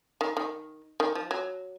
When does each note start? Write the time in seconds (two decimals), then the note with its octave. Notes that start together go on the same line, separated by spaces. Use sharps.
0.21 D#3
0.37 D#3
1.00 D#3
1.15 F3
1.31 F#3